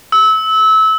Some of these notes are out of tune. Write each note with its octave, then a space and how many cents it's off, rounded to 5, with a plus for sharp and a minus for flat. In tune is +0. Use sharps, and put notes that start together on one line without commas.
E6 -25